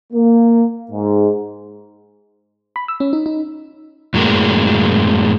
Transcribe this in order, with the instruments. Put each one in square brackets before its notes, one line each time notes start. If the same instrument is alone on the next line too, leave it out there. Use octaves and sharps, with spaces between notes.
[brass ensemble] A#3
G#2
[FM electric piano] B5
E6
C#4
D#4
D#4
[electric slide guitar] F#2 A2 F#3 G#3 A#3